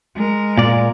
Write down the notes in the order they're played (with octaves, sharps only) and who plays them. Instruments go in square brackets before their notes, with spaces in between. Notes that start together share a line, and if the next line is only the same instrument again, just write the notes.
[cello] G#3 A#4
[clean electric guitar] A#2 D5